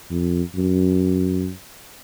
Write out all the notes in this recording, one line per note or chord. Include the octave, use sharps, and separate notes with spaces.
F2
F#2